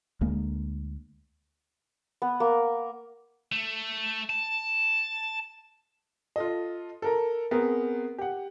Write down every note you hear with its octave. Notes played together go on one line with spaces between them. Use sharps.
D2 G#3 A#3
B3
A#3
A3
A5
F4 A4 D#5
A4 A#4 A#5
B3 C4 G#4 A#4
G4 F#5